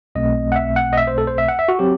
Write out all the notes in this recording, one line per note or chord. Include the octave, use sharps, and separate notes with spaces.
B1 B2 A3 C4 D#5
F#5
E5
F#5
D#5
E5
C5
A4
C5
E5
F#5
E5
F#4
F#3 C4 G4